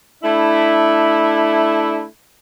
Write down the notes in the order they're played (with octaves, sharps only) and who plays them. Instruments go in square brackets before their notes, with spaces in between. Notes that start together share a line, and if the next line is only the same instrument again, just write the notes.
[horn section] A3 D4 E4